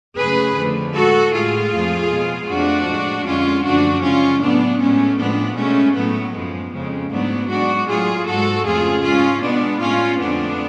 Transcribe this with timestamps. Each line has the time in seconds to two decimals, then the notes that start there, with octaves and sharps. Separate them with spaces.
0.18 F#2 C#3 F#3 A3 G#4 B4
0.56 F2 D3 F3 A3
0.95 A2 G#3 F#4 A4
1.33 A2 G#3 F4 G#4
1.72 F2 F3 A3
2.10 B2 G#3
2.49 F2 F3 A3 D4 F#4
2.88 A2 G#3
3.26 F2 D3 G#3 C#4 F4
3.64 F#2 D3 F3 A3 D4 F#4
4.03 F#2 C#3 G#3 C#4 F4
4.41 A2 F#3 A3 B3 D4
4.79 A2 G#3 A3 C#4
5.18 A2 F3 G#3 B3 D4
5.56 B2 G#3 A3 C#4
5.95 A2 F#3 A3 B3
6.34 F#2 F3 G#3
6.73 F2 C#3 G#3
7.10 G#2 F#3 A3 B3 D4
7.49 G#2 G#3 D4 F#4
7.88 A2 F#3 A3 F4 G#4
8.26 G#2 G#3 F#4 A4
8.65 F2 C#3 F3 A3 F4 G#4
9.03 G#2 G#3 C#4 F4
9.42 B2 G#3 B3 D4
9.80 A2 G#3 C#4 F4
10.19 F2 D3 F3 A3 B3 D4